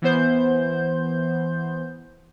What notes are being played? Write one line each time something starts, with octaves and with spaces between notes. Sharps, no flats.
E3 B3 C5 G6